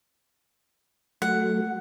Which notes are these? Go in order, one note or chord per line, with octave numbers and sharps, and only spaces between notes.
F#3 A3 F#5